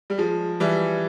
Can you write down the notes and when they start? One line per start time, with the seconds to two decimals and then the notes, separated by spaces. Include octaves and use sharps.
0.10 G3
0.17 F3 G#3
0.60 E3 G3